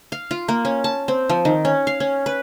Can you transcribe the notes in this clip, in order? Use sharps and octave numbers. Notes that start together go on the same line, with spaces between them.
F5
F4
A#3
C#4
A5
C4
F3
D#3
C#4
F5
C#4
B4